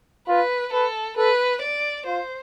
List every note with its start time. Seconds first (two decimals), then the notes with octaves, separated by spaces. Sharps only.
0.28 F4 B4
0.73 A4 B4
1.17 A4 B4
1.62 D5
2.06 F4 C5